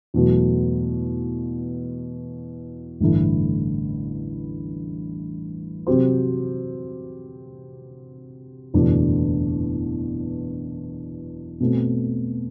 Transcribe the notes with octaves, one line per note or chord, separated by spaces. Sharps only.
E2 B2 F#3 A3
A1 G2 D3 A3 E4
C3 F#3 C4 G4 C5
F#1 E2 B2 A3 D4
B2 A3 C4